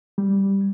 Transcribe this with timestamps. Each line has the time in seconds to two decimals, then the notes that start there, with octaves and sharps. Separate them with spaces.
0.18 G3